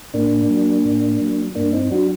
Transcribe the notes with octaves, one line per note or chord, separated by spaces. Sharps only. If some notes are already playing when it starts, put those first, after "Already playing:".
A2 A#3 D4
F#3
A2
F#3
G2 A#3 D4
C4 D#4
F#3 D4 F#4